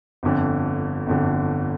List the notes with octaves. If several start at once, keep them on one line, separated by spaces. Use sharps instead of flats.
G1 F2 D3
G1 F2 D3